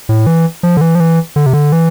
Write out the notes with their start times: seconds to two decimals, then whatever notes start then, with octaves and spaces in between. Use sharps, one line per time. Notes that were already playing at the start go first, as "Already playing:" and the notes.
0.09 A2
0.27 E3
0.63 F3
0.77 D3
0.81 E3
0.95 F3
1.00 E3
1.36 D3
1.46 C3
1.53 D3
1.72 E3